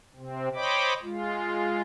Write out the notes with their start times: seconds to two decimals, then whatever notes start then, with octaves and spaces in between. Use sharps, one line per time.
0.16 C3 C4
0.55 C5 C#5 D#5 G5 B5 D6
1.03 G#3 F4